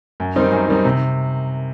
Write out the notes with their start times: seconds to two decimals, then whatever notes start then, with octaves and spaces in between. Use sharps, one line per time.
0.20 F#2
0.36 D#3 G3 C4 D#4
0.52 F#2
0.68 D#3 G3 C4 D#4
0.85 C3